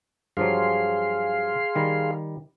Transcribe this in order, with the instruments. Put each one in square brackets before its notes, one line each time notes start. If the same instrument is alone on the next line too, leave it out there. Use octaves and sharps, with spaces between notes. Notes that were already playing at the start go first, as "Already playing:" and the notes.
[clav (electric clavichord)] G2 F3 F#3 [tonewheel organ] G#4 F5 C6
[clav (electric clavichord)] D#3 G3